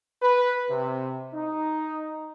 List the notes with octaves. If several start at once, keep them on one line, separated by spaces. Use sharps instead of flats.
B4
C3
D#4